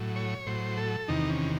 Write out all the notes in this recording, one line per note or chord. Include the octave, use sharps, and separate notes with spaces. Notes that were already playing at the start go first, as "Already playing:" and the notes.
Already playing: A2 F#3
C#5
A2 F#3 C5
A4
E2 C3 D#3 D#4
C#4